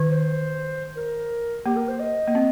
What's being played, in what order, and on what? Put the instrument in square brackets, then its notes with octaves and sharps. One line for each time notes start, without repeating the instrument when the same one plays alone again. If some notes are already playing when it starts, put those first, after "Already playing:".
Already playing: [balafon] D#3
[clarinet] C5
A#4
[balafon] A#3 [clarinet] G4
[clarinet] A#4
C5
D#5
[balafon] A#3
C4